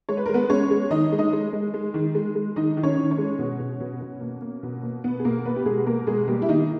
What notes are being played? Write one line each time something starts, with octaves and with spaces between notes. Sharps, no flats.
G#3 C#5
B4
G#3 A#4
B3 B4
G#3 C#4 C#5
G#3
D#3 D#4 D#5
G#3
D#4 D#5
G#3
G#3
G#3
D#3
G#3
G#3
D#3 D#4 D#5
D#3
C#4 C#5
D#3
C#4 C#5
G#3
B2
B2
B2
B2
A#3
A#3
B2
A#3
B2 B3 B4
G#4
B2 A#3 A#4
A#3 B3 B4
G4
B2 G#3 G#4
A#3 A#4
B2 G#3 G#4
G3 A#3 G4
E4
D#3 A#3 D#4